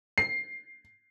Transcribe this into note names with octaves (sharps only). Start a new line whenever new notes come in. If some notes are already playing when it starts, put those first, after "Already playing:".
C7